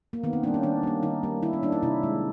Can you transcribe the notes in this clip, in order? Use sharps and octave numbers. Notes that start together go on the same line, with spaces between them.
A#3
D#3 B3
C4
G3 A#3 D4
C#4
D#3 D4
G3 A#3
D#3 D#4
G3 A#3
D#3 E4
C#4
G3 A#3 D4
D#4
C3 E4
D#3 G#3